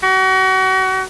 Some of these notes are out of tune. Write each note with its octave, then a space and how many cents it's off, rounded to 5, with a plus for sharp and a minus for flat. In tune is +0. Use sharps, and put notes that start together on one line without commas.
F#4 +35